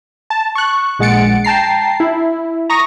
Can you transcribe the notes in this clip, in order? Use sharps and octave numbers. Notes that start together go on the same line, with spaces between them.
A5
C#6 F#6
A#1 G#3 F#5 A6 C#7 D7
G5 A5 A#5 C7
E4
A#5 C#6 D#6 A#6